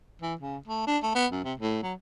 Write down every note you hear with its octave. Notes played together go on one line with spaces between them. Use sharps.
E3
C#3
A3
D4
A3
B3
F#2
C3
A2
F#3